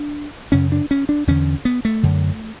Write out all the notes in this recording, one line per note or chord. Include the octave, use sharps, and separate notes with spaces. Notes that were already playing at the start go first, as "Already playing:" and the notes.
Already playing: D4
F#2 C#3 C#4
D4
C#4
D4
E2 D3 C#4
B3
A3
F#2 D3